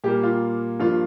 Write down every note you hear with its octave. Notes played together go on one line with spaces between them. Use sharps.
A#2 G3 A#3 G4
F4
G2 F3 A#3 F4